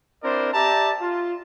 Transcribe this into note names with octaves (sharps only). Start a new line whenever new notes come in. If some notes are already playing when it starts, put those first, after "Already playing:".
C4 D4 E4 A#4 C5 D5
G4 D5 E5 A5 A#5
F4